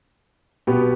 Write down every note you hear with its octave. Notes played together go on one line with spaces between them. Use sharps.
B2 B3 G4